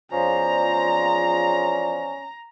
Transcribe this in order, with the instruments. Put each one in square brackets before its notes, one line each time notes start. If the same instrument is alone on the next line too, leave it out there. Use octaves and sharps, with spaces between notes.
[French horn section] E2 D5 [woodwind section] F3 [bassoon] C#4 [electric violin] A#5